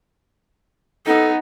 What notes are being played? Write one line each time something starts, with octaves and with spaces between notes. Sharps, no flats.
B3 D#4 A4